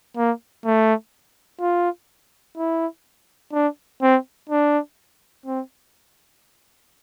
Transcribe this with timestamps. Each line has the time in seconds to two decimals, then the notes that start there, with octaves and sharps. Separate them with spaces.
0.17 A#3
0.65 A3
1.60 F4
2.58 E4
3.53 D4
4.02 C4
4.49 D4
5.46 C4